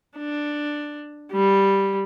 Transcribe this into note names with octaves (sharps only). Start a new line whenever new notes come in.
D4
G3